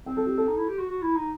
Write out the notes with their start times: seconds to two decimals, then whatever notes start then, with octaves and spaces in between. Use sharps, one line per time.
0.06 C4 G5
0.17 A4
0.26 G4
0.38 A4
0.47 D#4
0.57 E4
0.68 G4
0.79 F#4
0.89 F#4
1.02 E4
1.16 D#4